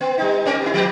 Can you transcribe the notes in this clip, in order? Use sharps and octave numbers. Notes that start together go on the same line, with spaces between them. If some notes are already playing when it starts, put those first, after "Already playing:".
B3
G3 D#4
G3 C4 A#4
B3 E4
F3 B3 G4